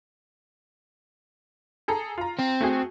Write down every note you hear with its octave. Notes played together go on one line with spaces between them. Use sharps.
G#4 A4 A#5
F4 A#5
C4
A3 F#4 G#4